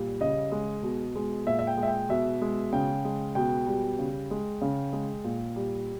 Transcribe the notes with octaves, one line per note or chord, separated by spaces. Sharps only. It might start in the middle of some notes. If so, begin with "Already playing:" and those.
Already playing: A#2 G3
C#3 D#5
G#3
B2
G#3
A#2 E5
E5
G5
G#3
E5
G5
B2 E5
G#3
C#3 G5
G#3
B2 G5
G3
C#3
G#3
C#3
G#3
A#2
G3